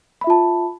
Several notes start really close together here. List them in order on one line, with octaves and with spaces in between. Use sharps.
B5 E5 F4 A5